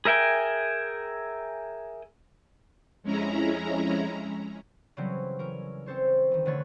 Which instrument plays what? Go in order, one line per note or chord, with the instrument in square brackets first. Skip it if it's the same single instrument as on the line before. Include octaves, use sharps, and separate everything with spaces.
[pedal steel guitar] G#4 A#4 E5 G5 G#5
[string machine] F2 G#3 C#4 E4 A#5
[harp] C#3 E3 F#3 G3 C4 C#4
E3 C#4 A#4
C4 C#4 A4 C5 C#5
D#3 E3
F1 D3 A3 B4 C#5 A6